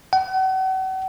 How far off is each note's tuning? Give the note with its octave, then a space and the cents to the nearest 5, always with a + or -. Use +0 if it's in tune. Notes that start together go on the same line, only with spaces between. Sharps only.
F#5 +40